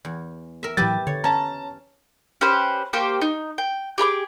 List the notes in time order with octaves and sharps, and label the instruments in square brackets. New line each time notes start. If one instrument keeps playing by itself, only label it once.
[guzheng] E2
A#4 E5
[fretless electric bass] A2 E3 F#3 [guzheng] G4 B4 E5 [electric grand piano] A6
[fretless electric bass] D3 [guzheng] C#5
[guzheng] C#4 [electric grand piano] A5 A#5
[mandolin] C#4 G4 B4 C5
A#3 G4 C5 C#6
D#4
G5
G4 G#4 B5 D6